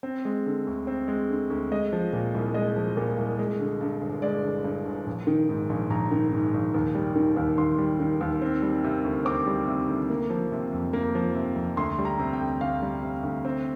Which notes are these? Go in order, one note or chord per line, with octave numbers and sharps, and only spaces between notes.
C4
G#3
D3
D2
C4
G#3
D3
D2
G#3 D#5
F3
A#2
C2
G#3 D#5
F3
A#2
C2
G#3
D3
G2
G1
G#3 D5
D3
G2
G1
A#1
D#3
G#2
A#1
A#1 A#5
D#3
G#2
A#1
D#2
G3
D#3
D#2
D#2 C6
G3
D#3
D#2
C4
G3
C3
D2
C4 D6
G3
C3
D2
A#3
F3
C3
F2
A#3
F3
C3
F2
D2 C6
G3
A#5
C3
G5
D2
D2 F5
G3
C3
D2
C4